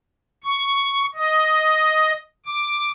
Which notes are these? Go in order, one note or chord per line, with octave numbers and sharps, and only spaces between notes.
C#6
D#5
D6